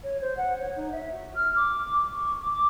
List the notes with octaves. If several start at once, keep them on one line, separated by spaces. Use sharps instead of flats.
C#5
C5
F#5
C#5
D#4
E5
F#4
F6
D6
C#6
D6
D6